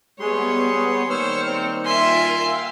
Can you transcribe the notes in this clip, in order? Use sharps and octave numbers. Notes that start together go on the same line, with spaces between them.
G3 G#3 B3 G#4 C#5 C6
D#3 G3 A#3 C5 C#5 E6 F6 C#7
C4
F4 A#4 E5 G#5 C6
F5 G5 E6